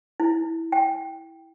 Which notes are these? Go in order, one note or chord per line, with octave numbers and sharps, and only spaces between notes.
E4
G5